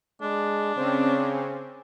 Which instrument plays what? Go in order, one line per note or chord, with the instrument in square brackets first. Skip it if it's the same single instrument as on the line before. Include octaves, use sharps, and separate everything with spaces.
[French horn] G#3 [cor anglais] D4
[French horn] C#3 [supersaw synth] C4 C#4